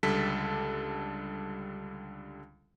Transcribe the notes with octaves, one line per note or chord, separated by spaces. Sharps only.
C#2 D3 G3 A4 A5 B6